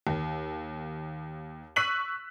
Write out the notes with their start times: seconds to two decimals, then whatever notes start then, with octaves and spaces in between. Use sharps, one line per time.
0.07 D#2
1.76 C#6 E6 F#6 B6 D#7 F#7